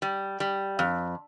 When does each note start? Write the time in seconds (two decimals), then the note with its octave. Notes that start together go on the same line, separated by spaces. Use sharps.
0.02 G3
0.40 G3
0.79 F2